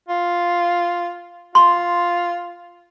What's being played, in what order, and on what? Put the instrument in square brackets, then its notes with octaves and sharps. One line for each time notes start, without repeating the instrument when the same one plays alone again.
[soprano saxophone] F4
[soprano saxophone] F4 [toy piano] C6